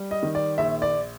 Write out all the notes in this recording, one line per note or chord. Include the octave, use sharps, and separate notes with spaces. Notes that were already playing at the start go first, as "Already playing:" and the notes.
Already playing: G3
D#5
D#3
D5
A#1 E5
D5